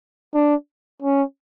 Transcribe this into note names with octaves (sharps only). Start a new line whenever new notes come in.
D4
C#4